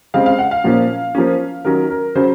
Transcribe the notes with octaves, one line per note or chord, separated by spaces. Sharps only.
C#3 G#3 C4 F5
F5
F#5
F5
A#2 F3 A#3 C#4
F3 A#3 C#4
D#3 F#3 C#4 A#4
A#4
C#3 F#3 C#4 C5